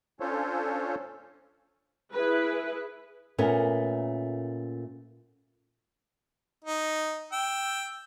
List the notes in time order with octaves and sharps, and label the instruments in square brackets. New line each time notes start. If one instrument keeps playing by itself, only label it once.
[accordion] C#4 D4 F4 A4 C5 C#5
[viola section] E4 G#4 B4
[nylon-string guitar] A#2 A3 B3 C#4 A#4
[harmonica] D#4
G5 E6